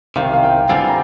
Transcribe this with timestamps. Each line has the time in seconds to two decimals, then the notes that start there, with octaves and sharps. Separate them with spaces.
0.16 C2 C3 D#3 F5
0.33 F5
0.43 G5
0.69 G2 D3 G3 C4 F4 G#5
0.88 A#5